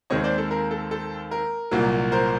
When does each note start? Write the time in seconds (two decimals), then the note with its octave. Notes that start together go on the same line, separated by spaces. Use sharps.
0.10 D#2 D#3 G#3 C4 C#5 D#5
0.24 C5 D5
0.38 A4
0.51 A#4
0.71 A4
0.91 A4
1.31 A#4
1.71 C2 A#2 F#3 A#3
2.12 A#4 C5